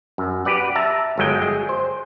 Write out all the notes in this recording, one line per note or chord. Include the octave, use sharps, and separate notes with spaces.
F#2
G4 B4 D5 F#5
E5 A5 A#5
G1 F#3 G#3 G5
G#4
C5